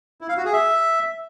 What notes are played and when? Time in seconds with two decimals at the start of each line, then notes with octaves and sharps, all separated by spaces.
0.21 E4
0.29 F5
0.37 F#4
0.45 G#4
0.53 E5